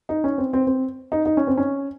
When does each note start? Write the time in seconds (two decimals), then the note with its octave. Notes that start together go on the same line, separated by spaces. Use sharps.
0.09 D#4
0.24 C#4
0.38 C4
0.53 C4
0.67 C4
1.12 D#4
1.26 D#4
1.37 C#4
1.47 C4
1.57 C#4